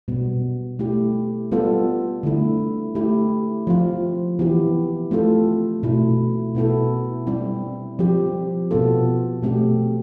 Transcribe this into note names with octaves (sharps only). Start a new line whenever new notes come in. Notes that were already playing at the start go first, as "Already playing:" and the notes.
B2 G3 B3
A3 E4 G4
G3 B3 F4 A4
D3 A3 E4
A3 E4 G4
F3 C4 F4
E3 B3 E4 G4
A3 C4 F4 A4
B2 A3 E4
B2 B3 E4 A4
G3 C4 E4
F3 C4 G4
B2 B3 F4 A4
B2 A3 C4 G4